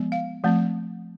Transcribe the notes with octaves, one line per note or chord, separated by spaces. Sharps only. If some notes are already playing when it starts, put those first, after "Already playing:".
Already playing: F3 G#3 B3
F5
F3 A3 C4